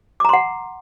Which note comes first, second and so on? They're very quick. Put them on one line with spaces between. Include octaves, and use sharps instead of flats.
D6 A#5 C6 F#5